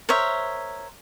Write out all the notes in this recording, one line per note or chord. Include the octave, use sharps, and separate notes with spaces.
A#4 C5 C#5 E5